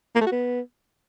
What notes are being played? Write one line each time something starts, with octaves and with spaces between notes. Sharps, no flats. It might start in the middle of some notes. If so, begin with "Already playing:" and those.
A#3
A3
F#4
B3